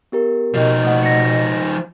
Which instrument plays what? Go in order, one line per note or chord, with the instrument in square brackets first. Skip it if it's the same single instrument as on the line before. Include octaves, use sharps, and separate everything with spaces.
[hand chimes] B3 G4 A#4
[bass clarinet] B2 [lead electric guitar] F3 D#4
[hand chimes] A3 F#5
A#6 C#7